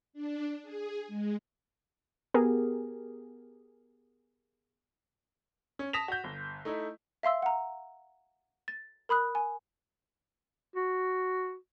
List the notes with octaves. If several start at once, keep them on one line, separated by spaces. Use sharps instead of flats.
D4
G#4
G#3
B3 G4 G#4 A#4
C#4
A5 D#6 A#6 B6 E7 F7
F#4 G6
G1
A3 D#4 E4
E5 F5 C6 E6
F#5 A#5
A6
A#4 B5 D#6 F#6
G#5
F#4